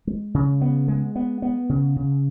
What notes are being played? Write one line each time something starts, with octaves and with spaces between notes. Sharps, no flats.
G#3
C#3
B3
G#3
B3
B3
C#3
C#3